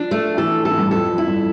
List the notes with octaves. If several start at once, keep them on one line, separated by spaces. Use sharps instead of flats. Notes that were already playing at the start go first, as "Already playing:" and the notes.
Already playing: F3 D4
A3
E3 A4
A4
A2
G2
F2 A4
F2
E4
G2